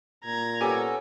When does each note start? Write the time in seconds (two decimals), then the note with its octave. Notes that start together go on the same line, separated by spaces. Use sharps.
0.24 A#2 A#5 G#6
0.61 B3 C#4 G4 A4 G#5 D6